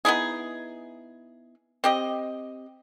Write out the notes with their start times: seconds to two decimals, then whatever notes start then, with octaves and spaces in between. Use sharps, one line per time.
0.05 B3 D#4 E4 G#4
1.84 C4 G4 D#5